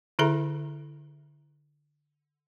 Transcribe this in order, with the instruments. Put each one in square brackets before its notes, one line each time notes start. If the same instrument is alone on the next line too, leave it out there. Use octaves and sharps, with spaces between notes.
[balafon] D3 E4 G#4 A4 E5 A#5